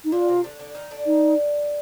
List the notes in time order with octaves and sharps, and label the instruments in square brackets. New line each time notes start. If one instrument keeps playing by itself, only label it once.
[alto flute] D#4
[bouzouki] D3 D4 [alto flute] F4
[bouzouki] C3 C4
D3 D4
D3 D4
D#3 D#4
D3 D4
[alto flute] D#4